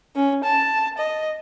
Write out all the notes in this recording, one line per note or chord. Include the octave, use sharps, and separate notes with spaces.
C#4
A5
D#5